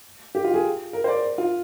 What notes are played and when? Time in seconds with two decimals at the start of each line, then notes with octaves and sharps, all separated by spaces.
0.35 G4
0.44 F4
0.54 G#4
0.93 A#4
1.04 C5
1.08 D5
1.38 F4